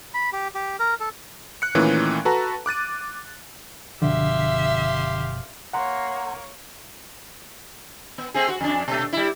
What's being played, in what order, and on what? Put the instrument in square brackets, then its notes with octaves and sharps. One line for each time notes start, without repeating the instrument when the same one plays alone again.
[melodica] B5
G4
G4
A#4
A4
[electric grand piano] F#6 C#7
A#2 D#3 E3 A3 C#4
F#4 A4 B4 A5 A#5
D6 F#6 A6 D#7
[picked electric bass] F#1 B2 F3 [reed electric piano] D3 [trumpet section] G4 F5 C6 [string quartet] E5
[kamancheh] A#3 C#5 [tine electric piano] F#5 A#5 C6
[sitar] B3
A3 C4 G#4
F#4
F2 D4
B2 A3
G3 E4